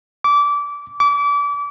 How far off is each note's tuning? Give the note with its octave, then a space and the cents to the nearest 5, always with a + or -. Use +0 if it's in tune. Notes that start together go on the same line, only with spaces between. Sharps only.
D6 -20
D6 -30